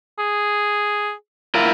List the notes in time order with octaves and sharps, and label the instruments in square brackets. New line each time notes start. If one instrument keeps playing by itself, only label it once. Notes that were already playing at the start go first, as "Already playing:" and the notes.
[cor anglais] G#4
[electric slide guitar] E4 F4 A#4